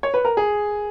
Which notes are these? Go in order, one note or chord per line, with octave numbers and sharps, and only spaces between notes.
C#5
B4
A#4
G#4